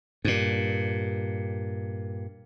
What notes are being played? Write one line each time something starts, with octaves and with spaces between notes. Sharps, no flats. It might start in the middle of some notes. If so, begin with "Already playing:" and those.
G2 A#2